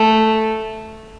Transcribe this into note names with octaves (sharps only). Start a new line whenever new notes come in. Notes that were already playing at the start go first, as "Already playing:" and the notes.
Already playing: A3